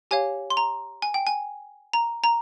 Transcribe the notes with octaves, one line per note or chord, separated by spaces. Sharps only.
G4 C#5 F5 G#5
C6
A#5
G#5
G5
G#5
A#5
A#5